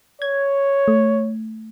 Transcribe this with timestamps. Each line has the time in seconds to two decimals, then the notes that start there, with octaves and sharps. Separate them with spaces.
0.22 C#5 G#6
0.88 A3